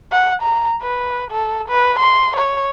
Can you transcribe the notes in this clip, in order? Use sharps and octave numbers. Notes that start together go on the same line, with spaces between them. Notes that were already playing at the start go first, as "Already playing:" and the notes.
F#5
A#5
B4
A4
B4
C6
C#5